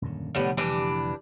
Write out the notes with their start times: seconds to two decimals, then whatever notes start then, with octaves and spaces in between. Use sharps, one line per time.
0.02 D#1 F#2 D3
0.35 F1 A2 D3 G3 B3
0.57 E3 G3 D4